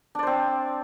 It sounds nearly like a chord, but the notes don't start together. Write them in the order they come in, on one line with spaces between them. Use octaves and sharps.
D4 D5 C5 C4